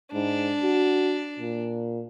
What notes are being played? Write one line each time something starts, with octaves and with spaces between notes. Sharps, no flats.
G#2 D4
F#4
A#2